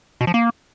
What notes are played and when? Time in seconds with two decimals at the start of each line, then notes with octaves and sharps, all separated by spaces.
0.21 B2
0.27 F3
0.34 A#3